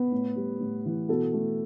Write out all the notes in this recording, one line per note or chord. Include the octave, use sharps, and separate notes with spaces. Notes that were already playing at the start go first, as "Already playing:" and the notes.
Already playing: B3 B4
A2
G3
A2
E3
B2 A4
A3